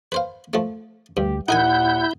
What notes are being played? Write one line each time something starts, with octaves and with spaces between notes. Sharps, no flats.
B4 C5 F5
F3 A3
D2 G2 G4
D#2 A#2 D#4 E4 A#4 F#5 G#5 G6